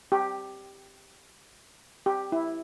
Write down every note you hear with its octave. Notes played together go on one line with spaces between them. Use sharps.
G4
G4
E4